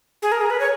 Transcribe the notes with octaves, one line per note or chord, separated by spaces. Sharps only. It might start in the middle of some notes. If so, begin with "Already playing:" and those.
G#4
A#4
G#4
B4
C#5